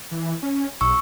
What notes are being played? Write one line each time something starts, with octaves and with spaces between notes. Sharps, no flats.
E3
C#4
B1 C#6 E6